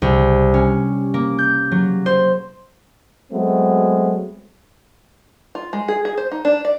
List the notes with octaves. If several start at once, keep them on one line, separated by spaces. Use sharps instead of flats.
C2
C#4
A#3
G6
F#3
C5
F#3 G#3 A3 B3 C4
F4
G#3
G#4
G#4
C5
D#4
D4
D5